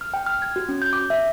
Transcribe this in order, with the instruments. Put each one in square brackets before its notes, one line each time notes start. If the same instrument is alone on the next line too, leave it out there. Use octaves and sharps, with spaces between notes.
[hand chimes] F6
G5
F6
G#6
F#4
C#4
G6
D6
E5